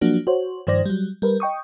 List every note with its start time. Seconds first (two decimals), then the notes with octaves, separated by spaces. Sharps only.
0.01 F3 F#3 A#3 D4 F#4
0.27 F#4 C5 C#5
0.67 G2 D#3 F3 C5 D5 A#6
0.85 F#3 G3
1.22 G3 A#4 B4
1.40 D#5 G5 C#6 D#6